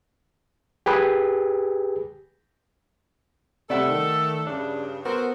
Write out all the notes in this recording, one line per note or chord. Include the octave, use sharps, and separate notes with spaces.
G4 G#4 B4
C3 G3 A3 A4 D5 E5 F#5
D#3
G2 C#3 D4
B3 F#4 A4 A#4 C5